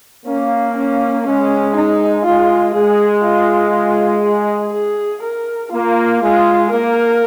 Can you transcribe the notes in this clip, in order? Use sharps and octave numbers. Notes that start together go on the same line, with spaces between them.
A#3 C#4
C#4
G#3 C#4
D#4
G#3 F4
G#3 G#4
F4
F4
G#4
G#4
A#4
A#3 F4
G#3 F4
A#3 A#4